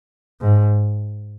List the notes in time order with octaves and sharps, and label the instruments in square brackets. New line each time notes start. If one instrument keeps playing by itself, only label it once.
[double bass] G#2